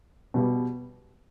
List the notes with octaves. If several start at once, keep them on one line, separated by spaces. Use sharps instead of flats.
B2 G3 B3